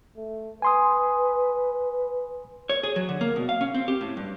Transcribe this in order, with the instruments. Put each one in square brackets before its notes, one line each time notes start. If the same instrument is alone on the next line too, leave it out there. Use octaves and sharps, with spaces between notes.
[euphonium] A3
[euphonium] B4 [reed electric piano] G#5 C6 D#6
[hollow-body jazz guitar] C#5
G#4
F#3
D3
A#3
B2
F5
C#4
C4
G4
A2
G2